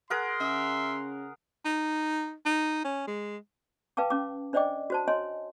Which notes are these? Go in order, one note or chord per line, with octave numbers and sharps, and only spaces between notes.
G#4 A#4 F#5 C6
C#3 E5
D#4
D#4
C#4
G#3
B4 F5 G5 A5 D6
C#4 D6
D4 C5 D5 D#5 G5 D6
F#4 C5 A5
C#5 D#5 G#5 C6